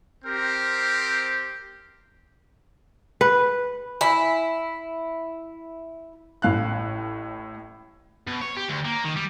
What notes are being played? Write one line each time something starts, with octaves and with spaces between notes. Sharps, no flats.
C4 G4 A#4 C5
B4
E4 G#5 B5
A1 A2 F5 F#6
B2
C#5
G4
D2
A#3
D#3
G3